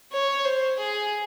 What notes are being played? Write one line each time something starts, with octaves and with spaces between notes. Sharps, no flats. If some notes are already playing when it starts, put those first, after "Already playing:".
C#5
C5
G#4